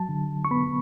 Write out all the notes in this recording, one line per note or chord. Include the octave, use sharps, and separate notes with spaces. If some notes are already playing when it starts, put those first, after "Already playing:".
Already playing: F#3 A5
D3
C#6
B3 B5